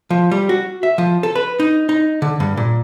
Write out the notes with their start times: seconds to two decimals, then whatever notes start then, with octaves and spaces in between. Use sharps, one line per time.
0.10 F3
0.31 G3
0.49 F#4
0.83 E5
0.98 F3
1.23 A4
1.35 B4
1.60 D#4
1.89 D#4
2.22 D3
2.40 G2
2.57 A#2